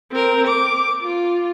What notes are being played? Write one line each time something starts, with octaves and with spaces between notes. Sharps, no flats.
C4 A#4
D6
F4